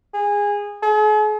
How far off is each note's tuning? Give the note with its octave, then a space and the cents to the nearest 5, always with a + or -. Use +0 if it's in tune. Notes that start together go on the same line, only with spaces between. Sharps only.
G#4 -20
G#4 +45